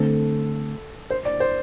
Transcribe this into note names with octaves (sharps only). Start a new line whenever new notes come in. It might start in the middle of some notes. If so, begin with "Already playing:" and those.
Already playing: D3 A3 C4 A4
C5
D5
C5